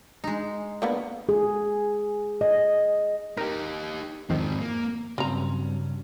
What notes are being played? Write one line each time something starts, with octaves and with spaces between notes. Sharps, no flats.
G#3 D#4
D3 A#3 B3
G#4
D#5
D#4 G4 A#4
F2 G#2 D#3 F3 C4
A#3
G2 C#3 F#3 C4 C#4 A#5